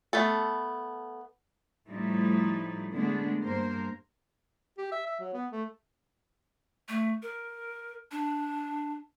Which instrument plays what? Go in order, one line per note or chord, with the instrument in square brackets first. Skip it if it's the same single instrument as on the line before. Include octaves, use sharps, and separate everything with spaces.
[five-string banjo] A3 B3 A4
[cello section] A2 F3 G3 A3 D#4 E4
D3 G#3 A3 B3 D4
G2 A#3 A#4 C5
[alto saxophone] G4
E5
E5
F#3
B3
A3
[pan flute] A3
A#4
D4